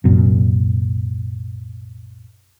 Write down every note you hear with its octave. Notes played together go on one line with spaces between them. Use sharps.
C2 F#2 A#2